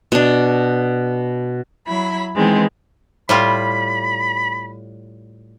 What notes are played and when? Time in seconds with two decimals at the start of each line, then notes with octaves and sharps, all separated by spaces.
0.12 B2 D4
1.85 F#3 E4 B5
2.34 D#3 E3 G#3 B3 C4
3.29 A2 G3 F4 B5